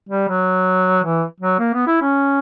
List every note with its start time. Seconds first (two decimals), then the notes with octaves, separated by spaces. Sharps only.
0.09 G3
0.29 F#3
1.04 E3
1.41 F#3
1.59 A#3
1.74 B3
1.87 E4
2.02 C#4